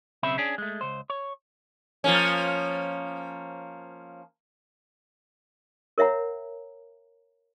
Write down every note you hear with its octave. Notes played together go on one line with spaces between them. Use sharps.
B1 C#3 C4 E5 B5
C#4 D4 G#4
G#3 A3
C#2 C5
C#5
F3 A#3 C#4
A#4 C#5 E5 F#5 A#5